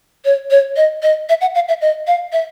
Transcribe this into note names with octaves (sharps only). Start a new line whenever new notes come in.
C#5
C#5
D#5
D#5
E5
F#5
F5
E5
D#5
F5
E5